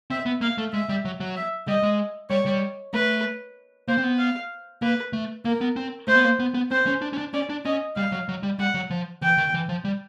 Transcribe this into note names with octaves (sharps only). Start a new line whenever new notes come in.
C4 E5
B3
A#3 F5
A3
G#3 E5
G3
F#3
F#3
E5
G3 D#5
G#3
G3 C#5
G3
A3 B4
A#3 C5
C4
B3
F5
A#3 B4
A3
A#3 A#4
B3
C4
A3 C5
B3
A#3
B3
B3
C4 C5
C#4
D4
C#4
D4
C#4 D5
D4
C#4 D#5
G3 F5
F#3
F#3
G3
G3 F#5
F#3
F3
E3 G5
D#3
E3
F3
G3